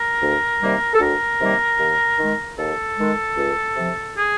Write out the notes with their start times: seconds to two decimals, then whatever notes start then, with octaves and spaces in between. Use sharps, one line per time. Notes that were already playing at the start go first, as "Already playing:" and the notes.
Already playing: A#4
0.22 D2
0.62 C3 D#3 G3 A#3
0.94 A4
1.00 D2 A#4
1.40 C3 D#3 G3 A#3
1.80 D#2
2.19 D#3 G#3
2.58 D#2 A4
2.98 D#3 G#3
3.37 C#2
3.77 C3 F3
4.17 G#4